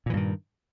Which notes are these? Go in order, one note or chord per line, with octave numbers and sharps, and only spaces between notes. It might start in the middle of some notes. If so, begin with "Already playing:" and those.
G2 A#2 D#3 E3